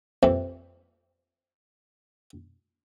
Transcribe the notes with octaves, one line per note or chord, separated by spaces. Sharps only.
F2 C3 E3 C4